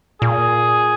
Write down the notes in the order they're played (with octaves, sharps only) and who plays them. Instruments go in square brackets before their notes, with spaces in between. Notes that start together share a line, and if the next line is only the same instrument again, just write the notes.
[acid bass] A#2 [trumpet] G#4